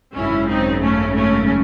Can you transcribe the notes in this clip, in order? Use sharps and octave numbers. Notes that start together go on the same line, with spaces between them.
G#1 F#2 C#3 C#4 E4
C4 D#4
A3 C#4
A3 C#4